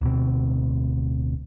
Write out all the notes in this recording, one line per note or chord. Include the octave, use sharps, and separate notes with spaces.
D1 D2 B2 C4